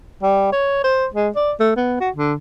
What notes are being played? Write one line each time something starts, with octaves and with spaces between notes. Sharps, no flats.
G3
C#5
C5
G#3
D5
A3
B3
F#4
D3